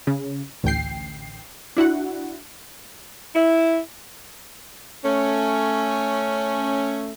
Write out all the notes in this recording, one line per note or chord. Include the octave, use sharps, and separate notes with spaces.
C#3
A1 D2 G5 C7
D4 E4 F#4 F#5
E4
A3 C#4